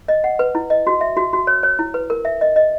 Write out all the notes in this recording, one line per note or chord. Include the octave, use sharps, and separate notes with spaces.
D#5
F#5
B4
E4
D#5
F#4
E5
F#4
F#4
C#5
C#5
E4
B4
A#4
E5
D#5
D#5